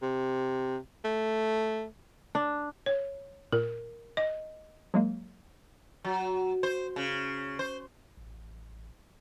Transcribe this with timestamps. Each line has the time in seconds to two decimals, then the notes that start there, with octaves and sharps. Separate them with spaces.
0.02 C3
1.05 A3
2.35 D4
2.86 C#5
3.52 A#2 A#4
4.17 D#5
4.94 F#3 G#3 A#3
6.04 F#3
6.63 C5
6.96 C#3
7.59 C5
8.17 A1